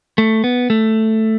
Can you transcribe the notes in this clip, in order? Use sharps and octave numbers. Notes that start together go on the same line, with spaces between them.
A3
B3
A3